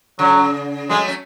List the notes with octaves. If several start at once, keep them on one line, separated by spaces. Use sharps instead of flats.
C#3 F#3
F#3 G#3 A3
C#4